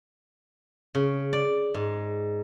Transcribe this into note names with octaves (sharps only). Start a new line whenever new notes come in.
C#3
D5
G#2